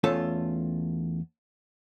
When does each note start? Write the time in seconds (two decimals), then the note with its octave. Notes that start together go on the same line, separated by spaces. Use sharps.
0.04 E2 A3 C#4 F4 A4 A5